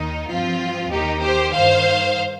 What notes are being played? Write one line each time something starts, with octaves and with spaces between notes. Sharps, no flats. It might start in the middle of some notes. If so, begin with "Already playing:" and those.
Already playing: D#2 D#3 D#4
G2 F3 C4 F4
D#2 D#3 D#4 G4
G4 C5
G2 D#3 C5 F5